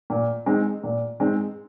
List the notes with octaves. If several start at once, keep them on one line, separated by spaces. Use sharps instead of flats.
A#2
G#3 C4 D#4
A#2
G#3 C4 D#4